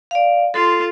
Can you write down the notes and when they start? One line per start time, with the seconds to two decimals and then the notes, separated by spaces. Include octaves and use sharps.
0.11 D5 F5
0.54 F4 A4 C6